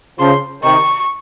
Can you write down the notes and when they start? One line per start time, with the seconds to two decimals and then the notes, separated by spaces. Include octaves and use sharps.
0.19 C#3 F3 C6
0.63 C3 D#3 C#6